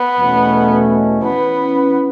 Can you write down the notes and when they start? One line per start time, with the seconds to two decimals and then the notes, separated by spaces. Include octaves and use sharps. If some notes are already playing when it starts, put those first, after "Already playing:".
Already playing: B3
0.17 E2 B2 A3 C#4
1.22 E3 B3 C#4 E4 B4